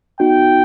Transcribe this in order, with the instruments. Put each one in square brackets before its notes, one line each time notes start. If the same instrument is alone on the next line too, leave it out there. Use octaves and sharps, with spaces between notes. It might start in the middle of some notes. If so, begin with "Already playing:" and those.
[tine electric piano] B3 D#4 F#4 [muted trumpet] G5